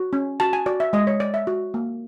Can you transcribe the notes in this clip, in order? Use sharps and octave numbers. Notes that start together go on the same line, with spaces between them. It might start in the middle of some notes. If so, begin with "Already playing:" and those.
Already playing: F#4
C#4
F#4 A5
G#5
F#4 D5
E5
G#3 D#5
C#5
G#3 D5
E5
F#4
A#3